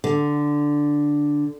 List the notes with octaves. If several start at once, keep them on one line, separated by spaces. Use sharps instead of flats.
D3